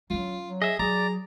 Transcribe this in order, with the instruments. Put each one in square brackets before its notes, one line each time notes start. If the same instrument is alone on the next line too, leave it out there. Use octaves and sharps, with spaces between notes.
[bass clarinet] F#3 [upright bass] C#4 D4 [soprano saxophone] F4
[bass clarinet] F#3
[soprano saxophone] G#4 [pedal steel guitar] D#5 E5
[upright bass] F#3 [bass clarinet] G#4 [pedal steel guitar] D5 [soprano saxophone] A#5